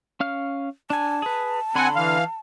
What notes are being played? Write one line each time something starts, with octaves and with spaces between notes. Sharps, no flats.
C#4 F5 F6
D4 G#5 A5
G#4 B4
D3 C4 F#5 G#5 B5 C6
E3 F5